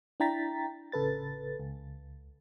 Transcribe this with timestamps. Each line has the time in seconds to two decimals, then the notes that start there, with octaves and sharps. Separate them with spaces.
0.20 D4 E4 G5 A#5 A6 B6
0.92 A1 C#3 A4 B4 A6
1.60 C#2